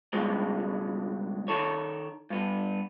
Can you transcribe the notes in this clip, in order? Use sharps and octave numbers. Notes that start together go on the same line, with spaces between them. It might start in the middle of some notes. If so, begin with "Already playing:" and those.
C#2 G2 B2 F#3 G#3
D#3 A4 C#5
G2 B3